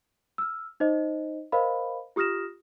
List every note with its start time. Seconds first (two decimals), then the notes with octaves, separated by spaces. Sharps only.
0.38 E6 F6
0.80 D#4 C5 D#5
1.52 A#4 C5 D#5 F5 B5
2.16 F4 G4 D#6 F6 A#6 E7